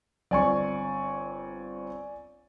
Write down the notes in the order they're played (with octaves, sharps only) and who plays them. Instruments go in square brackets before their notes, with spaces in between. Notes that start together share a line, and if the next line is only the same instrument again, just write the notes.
[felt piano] G1 C4 [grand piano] D5 G#5 C#6